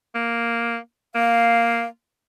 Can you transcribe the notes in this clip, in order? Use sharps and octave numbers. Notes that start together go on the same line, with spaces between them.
A#3
A#3 F5